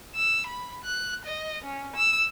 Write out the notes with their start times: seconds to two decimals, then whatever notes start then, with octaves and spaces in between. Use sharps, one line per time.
0.15 E6
0.47 B5
0.84 F#6
1.25 D#5
1.65 C#4
1.96 E6